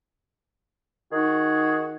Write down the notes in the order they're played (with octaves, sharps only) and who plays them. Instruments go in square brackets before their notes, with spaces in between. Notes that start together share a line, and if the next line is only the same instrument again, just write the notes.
[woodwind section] D#3 D#4 F#4 G#4